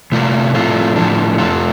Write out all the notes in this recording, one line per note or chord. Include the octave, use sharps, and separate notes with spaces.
C3 A3 F4 D5
A2 F3 A3 C4 F4
A2 F3 D4
F2 F3 A3 F4